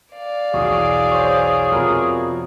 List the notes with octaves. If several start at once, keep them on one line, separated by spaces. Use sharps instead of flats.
D5 F5
B1 E2 F#4 G#4 E6
C5 C#5
F2 C3 B3 A#4